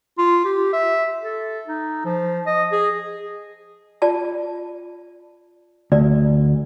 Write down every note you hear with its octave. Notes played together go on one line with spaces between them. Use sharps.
F4
G4
E5
A4
D#4
F3
D#5
G#4
F4 D5 A5
D2 D5